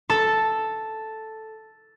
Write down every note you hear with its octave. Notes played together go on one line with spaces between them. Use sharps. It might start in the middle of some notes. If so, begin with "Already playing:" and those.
A4